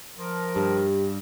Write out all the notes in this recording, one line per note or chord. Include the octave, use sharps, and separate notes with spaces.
F3 A#4
G2 G4